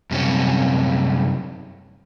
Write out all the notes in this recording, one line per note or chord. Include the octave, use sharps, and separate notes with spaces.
F#2 C3 G3 C4 C#4